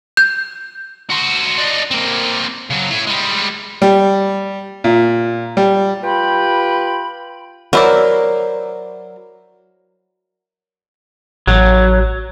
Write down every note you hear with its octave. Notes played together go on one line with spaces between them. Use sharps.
G6
F#4 C5
D4 D#4
A#3 C4
C#3 F#3
E4 C#5
G3 G#3
G3
A#2
G3
F4 G4 B4 G5 B5
F#3 E4 A#4 C5 D5
A1 F#3